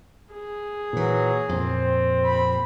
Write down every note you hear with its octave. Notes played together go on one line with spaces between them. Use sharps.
G#4
A#2 E3 F#3
F2 A#2 C4
B5